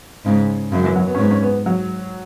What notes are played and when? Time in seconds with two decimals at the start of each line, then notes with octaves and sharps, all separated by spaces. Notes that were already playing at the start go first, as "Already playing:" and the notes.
0.25 G#2 C#3
0.71 F#2 C#3
0.84 E3
0.96 F#3
1.07 B3
1.15 C#4
1.18 G#2 B3
1.31 C#4
1.42 B3
1.66 F#3